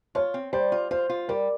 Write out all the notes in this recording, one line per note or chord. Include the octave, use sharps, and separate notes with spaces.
F4 C#5
C4
G3 C5
F4
F4 C5
F4
G3 A#4